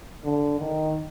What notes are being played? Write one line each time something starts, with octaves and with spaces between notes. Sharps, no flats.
D3
D#3